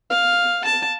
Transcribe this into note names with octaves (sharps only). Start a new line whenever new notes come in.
F5
A5